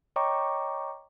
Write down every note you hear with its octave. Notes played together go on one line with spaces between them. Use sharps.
C#5 D#5 G5 A#5 C#6 D6